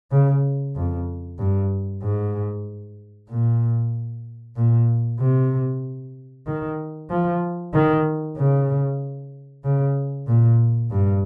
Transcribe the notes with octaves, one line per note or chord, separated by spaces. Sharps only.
C#3
F2
G2
G#2
A#2
A#2
C3
D#3
F3
D#3
C#3
C#3
A#2
G2